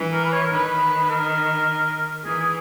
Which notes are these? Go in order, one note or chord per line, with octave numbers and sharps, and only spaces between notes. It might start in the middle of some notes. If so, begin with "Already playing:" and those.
Already playing: E3
A#4
B4
C#5
A#4
D#3 B4
B4
A#4
E3 G#4
G#4